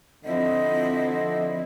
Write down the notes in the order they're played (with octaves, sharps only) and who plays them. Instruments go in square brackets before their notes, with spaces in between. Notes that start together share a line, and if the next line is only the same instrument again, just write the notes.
[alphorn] D3 [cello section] F3 C4 E4 [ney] D#5